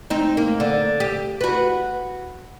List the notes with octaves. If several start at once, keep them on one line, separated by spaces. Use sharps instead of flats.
C4 D#4
A#3
D3
G4
F#4 B4